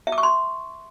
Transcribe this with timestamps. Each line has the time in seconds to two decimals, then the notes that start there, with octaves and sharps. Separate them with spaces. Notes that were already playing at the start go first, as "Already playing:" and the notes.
0.07 E5
0.12 D6
0.18 C#6
0.23 C6